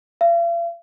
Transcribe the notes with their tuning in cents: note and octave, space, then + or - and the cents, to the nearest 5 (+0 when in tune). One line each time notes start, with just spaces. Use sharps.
F5 -45